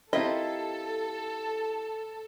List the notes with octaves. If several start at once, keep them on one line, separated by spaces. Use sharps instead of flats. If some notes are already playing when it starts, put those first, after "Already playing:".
C4 E4 F4 G4 A4 A#4 D#5